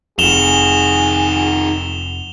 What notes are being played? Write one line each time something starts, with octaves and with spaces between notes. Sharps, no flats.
F1 F2 D#3 F#4 G#4 E7 F7 G7